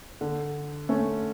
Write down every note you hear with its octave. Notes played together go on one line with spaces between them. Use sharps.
D3
A3 C#4